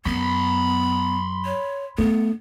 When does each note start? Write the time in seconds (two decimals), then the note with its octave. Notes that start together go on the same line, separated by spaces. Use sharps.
0.06 F#2 B3 B5 C6
1.46 C#5
1.98 A3 B3 D4